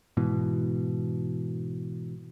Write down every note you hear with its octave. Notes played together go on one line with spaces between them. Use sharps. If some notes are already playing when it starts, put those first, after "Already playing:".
G#2 B2 E3